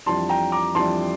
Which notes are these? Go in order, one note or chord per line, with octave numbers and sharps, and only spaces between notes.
F2 E3 G3 D4 A5 C6
G5 A#5
A#5 D6
F2 E3 G3 D4 A5 C6